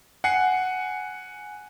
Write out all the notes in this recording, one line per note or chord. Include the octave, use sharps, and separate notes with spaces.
F#5 G#5 C7 C#7